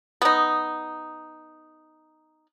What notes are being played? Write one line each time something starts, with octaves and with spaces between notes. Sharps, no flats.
B3 D#4